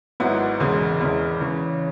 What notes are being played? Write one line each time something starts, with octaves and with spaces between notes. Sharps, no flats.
G#1 G#2 F#3 B3 E4
E1 E2 C#3 G#3
E2 C#3 G#3 E4
C#3 E3 C#4